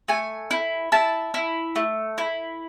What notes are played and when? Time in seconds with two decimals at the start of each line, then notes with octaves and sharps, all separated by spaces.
0.08 A3 G#5
0.51 E4
0.92 E4 A5
1.34 E4
1.76 A3
2.18 E4